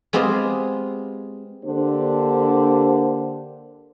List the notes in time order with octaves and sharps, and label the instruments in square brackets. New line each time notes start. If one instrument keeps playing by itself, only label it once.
[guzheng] G#3 B3 C4 F4 G4 D#5
[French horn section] D3 A#3 D4 G4 C5